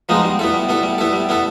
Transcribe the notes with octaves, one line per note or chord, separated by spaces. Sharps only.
F3 G#3 B3 D#4
G3
B3 E4 A4
G3
B3 E4 A4
G3
B3 E4 A4
G3
B3 E4 A4